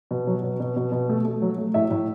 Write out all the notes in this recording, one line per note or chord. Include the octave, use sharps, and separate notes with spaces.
B2
F#3
B2
B2
B2
B2
A3
A3
F#3
A3
A2 E5
A2